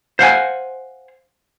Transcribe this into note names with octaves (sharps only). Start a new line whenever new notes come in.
C5 F5 F#5 G#5